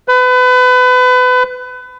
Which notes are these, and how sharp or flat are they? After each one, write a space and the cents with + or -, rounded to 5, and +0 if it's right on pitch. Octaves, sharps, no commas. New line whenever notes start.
B4 +30